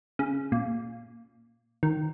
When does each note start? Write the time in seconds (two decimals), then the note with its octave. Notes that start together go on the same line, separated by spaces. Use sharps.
0.19 C#3
0.52 A#2
1.83 D#3